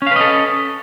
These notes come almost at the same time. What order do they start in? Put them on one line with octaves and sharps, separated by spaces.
C#4 F5 B4 D#5 A4